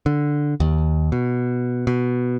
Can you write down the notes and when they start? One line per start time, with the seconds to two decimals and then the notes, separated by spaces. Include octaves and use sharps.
0.06 D3
0.60 D#2
1.12 B2
1.87 B2